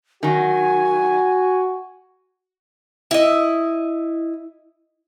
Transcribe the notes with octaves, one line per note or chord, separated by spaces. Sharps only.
D#3 F#3 F#4 G#5
E4 D#5